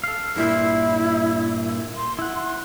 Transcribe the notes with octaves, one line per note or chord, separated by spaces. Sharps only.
A4 F5
G2 A#2 E4 C5
C6
E4 F#5